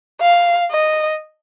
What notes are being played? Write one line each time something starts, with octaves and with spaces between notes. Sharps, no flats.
F5
D#5